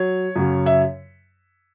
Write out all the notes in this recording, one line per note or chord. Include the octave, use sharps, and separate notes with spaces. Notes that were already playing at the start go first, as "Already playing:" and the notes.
Already playing: F#3 C#5
F#2 C#3 F#3
E5